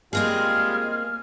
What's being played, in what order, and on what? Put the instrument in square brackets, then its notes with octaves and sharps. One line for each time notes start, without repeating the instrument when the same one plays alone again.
[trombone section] G3 G#3 F4 [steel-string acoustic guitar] A#3 C4 G#4 [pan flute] F6